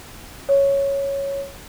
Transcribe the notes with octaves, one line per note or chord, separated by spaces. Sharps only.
C#5